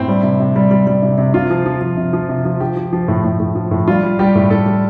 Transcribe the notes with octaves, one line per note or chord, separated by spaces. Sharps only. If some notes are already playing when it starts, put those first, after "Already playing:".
Already playing: A2 C4
G3
C3
C3
G3
G3
G3
C3
C3
C3 F4
F3
F3
F3
C3
F3
C3
F3
F3 G4
F3
F3
A2
A2
A2
F3
A2
G3 F4
G3
G3 G4
A2
A2 A4
G3